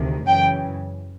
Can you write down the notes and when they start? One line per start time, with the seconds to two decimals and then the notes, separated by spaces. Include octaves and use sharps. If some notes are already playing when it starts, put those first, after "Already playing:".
Already playing: D2 C3 D#3
0.27 F#2 C#3 E3 G5